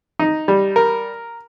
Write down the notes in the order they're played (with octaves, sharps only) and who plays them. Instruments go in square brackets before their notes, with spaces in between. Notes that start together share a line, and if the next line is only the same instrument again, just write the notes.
[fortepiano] D#4
G3
A#4